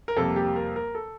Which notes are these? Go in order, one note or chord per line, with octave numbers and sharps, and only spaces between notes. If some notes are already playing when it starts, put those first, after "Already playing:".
A#4
F2 C3 G3 A#3 A4
G4
A#4
A#4
A4